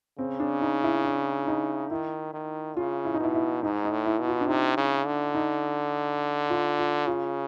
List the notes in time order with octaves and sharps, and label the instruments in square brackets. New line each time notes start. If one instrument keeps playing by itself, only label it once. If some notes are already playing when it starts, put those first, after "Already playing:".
[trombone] C#3 [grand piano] C4
[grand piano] D4
D#4
E4
D4
D#4
[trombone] D#3 [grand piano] E4
[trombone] D#3
[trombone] C#3 [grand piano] F4
[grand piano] E4
D#4
[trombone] B2 [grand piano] E4
[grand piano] E4
[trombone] G#2 [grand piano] D#4
[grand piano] D#4
[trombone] A2
[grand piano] E4
[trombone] B2
[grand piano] F4
D4
[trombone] C3 [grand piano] D#4
[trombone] C#3
D3
[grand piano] D#4
F4
F4
[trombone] C#3 [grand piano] F4